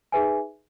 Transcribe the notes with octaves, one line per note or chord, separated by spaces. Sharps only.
D#4 G#4 B4 E5 G#5